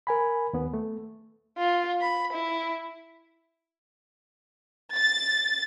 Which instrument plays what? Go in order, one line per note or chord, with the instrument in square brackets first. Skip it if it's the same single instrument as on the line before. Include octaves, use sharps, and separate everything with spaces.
[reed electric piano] A#4 G#5 B5
D#2 B3
A3
[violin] F4
B5
E4
[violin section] A6